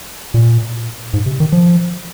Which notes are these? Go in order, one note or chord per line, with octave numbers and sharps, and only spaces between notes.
A#2
G#2
C3
D#3
F3